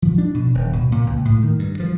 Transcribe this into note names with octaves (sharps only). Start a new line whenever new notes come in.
F3
D4
B2
D#1
B2
A#2
C#2
A2
D#3
G2
F3